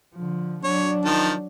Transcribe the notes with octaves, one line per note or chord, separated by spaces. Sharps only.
D3 F3
F#3 D4 C#5
D#3 F3 A5